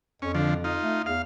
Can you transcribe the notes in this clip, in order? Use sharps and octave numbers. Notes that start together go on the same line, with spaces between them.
F2 C#4
D3 F3
D#4 F4
A3
E2 F5